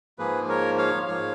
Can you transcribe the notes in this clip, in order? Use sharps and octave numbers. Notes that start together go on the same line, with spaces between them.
G#2 F3 A#3 G#4 B4
A#4 C#5
C#5 F5
G#2 F3 A#3 C#5 F5